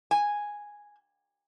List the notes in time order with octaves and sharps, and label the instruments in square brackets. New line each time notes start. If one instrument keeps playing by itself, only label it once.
[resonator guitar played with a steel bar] G#5